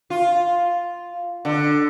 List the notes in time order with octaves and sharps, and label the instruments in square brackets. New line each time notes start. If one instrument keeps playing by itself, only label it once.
[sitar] F4
D3